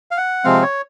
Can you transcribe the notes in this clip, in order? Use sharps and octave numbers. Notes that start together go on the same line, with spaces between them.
F5
F#5
C3 F3 G#3 C4 F5
C#5